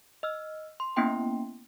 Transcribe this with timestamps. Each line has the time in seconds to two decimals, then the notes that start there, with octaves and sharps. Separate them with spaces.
0.23 D#5 E6 F6
0.80 C6
0.96 A#3 B3 C#4 E4 G5 C6